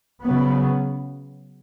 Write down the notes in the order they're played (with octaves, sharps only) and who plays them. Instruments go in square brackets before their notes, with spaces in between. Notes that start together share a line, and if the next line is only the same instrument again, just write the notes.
[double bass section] C#3 F#3 B3